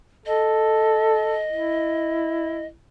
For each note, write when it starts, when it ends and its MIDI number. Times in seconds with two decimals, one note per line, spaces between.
0.26 1.46 69
0.26 2.66 75
1.52 2.71 64